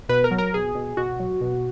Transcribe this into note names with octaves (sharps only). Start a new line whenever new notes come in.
B2 B4
A#4
F#3
A#4
B2 G#4
B2
B2 F#4
F#3
B2